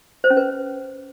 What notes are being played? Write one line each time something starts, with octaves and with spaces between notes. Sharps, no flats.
C5
C#4
B4